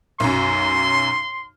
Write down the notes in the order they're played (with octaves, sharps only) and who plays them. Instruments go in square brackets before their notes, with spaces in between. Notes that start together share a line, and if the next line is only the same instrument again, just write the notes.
[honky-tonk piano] B1 F#2 [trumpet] C6